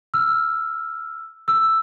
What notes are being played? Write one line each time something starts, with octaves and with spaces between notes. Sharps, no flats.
E6 F6
E6